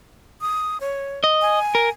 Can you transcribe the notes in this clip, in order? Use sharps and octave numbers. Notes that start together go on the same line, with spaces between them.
D#6
C#5
D#5
G#5
A#4